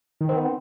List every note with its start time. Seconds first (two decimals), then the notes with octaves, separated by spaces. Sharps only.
0.21 D#3
0.29 C4
0.37 B3
0.45 C4